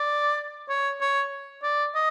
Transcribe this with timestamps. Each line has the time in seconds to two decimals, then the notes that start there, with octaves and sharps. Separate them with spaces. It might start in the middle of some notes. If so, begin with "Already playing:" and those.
Already playing: D5
0.69 C#5
1.01 C#5
1.63 D5
1.95 D#5